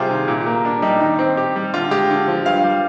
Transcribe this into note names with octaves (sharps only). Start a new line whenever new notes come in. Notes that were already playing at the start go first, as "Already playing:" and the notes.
Already playing: C3 G3 F4 G4 G#4 C5
D#3
A#2
A#3
D4
G3 D#4
D#3 D#4
C4
G4
G3
D3 F4
G#3 G4
D3
F3
G2 F5
G3